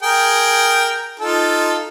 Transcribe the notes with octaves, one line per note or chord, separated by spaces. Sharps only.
G#4 A#4 G5
D#4 F4 A4